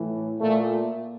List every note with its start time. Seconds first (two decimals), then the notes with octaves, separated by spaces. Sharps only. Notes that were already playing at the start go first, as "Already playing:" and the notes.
Already playing: A2 E3
0.39 A#2 A3